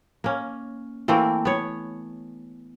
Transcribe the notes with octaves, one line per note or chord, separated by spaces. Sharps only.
A#3 C#4
E3 A3 A#3 C4
B3 C#5